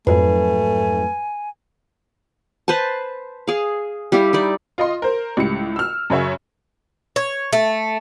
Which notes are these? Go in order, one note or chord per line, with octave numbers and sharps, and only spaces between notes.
F2 G#2 F#3 A3 B4 G#5
B4 C5 G#5 A5
G#4 F5
G3 E4 G4 F5
D#4 E4 D5
F4 D#5 C6
A#4 C5
C#2 A2 G3 C#7
E6 F6
F#2 C#3 C#5 E5
C#5
A3